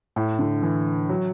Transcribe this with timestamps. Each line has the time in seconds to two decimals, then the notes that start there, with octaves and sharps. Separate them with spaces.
0.16 A2
0.39 D3
0.63 E3
1.09 F#3